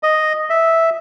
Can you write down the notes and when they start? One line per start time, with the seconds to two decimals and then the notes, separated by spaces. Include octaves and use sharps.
0.03 D#5
0.50 E5